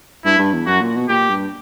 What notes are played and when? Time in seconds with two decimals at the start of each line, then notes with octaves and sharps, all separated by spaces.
0.25 G2 E4
0.39 G2
0.53 E2
0.67 F#2 F#4
0.81 A#2
0.95 B2
1.09 A#2 G4
1.30 G2